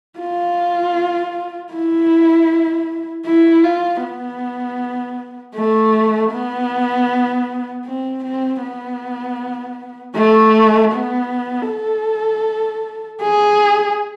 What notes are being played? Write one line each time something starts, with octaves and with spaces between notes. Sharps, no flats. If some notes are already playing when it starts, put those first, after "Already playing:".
F4
E4
E4
F4
B3
A3
B3
C4
C4
B3
A3
B3
A4
G#4